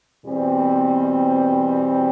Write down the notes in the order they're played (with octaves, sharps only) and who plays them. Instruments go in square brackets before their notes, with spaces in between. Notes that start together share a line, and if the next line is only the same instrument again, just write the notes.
[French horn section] E2 B2 G3 C4